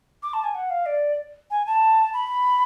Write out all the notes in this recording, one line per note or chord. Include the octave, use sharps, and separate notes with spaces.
D6
A5
G#5
F#5
F5
D5
G#5
A5
B5